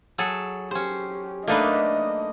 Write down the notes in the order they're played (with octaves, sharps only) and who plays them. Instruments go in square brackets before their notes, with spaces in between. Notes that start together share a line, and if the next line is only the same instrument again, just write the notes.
[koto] F#3 G#4 A4
[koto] C#4 C5 [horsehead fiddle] G4
[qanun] A3 D4 [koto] A#3 D#4 B4 [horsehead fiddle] D#5